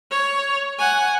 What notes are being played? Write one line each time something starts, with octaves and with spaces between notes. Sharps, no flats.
C#5
F#5 G#5